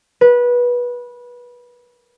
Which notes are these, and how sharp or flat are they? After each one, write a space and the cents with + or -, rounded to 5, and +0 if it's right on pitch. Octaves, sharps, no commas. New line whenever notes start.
B4 -20